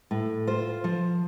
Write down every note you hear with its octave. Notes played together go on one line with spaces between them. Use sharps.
A2
F4 C5
F3